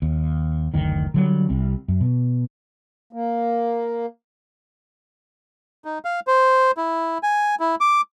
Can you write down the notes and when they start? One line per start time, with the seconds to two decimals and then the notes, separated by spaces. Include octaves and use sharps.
0.02 D#2
0.74 F#1 D2 D#3
1.14 D3 F#3 G3
1.49 C2 G3 C4
1.88 F#2
2.01 B2
3.13 A#3
5.85 D#4
6.05 F5
6.27 C5
6.77 E4
7.23 G#5
7.60 E4
7.81 D6